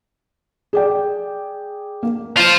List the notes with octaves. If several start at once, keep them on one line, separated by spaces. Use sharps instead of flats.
G#4 D5 G5
A#3
F4 C5